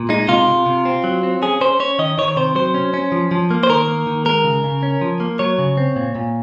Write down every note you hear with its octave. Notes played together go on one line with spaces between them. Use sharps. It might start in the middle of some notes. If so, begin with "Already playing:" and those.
Already playing: A#2
G#3 D#4
C3 F4
C3
C3
C4
F#3
C4
C#4 G#4
C#4 C5
C#4 C#5
D#3 D#5
D#3 C#5
C#5
C3 C5
F#3 C5
C#4
C#4
F3
F3
A#3
C5
D#3 A#4
A#3
D#3
G#3 A#4
C#3
C#3
C#4
F3
A#3
F#3 C#5
C#3
C4
A#2
A#2